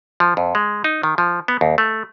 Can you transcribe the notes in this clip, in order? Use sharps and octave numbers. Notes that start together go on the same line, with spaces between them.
F3
F2
G#3
D#4
D#3
F3
B3
D#2
A3